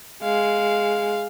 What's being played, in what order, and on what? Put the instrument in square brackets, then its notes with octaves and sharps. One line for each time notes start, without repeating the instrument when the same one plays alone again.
[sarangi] G#3 [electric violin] F5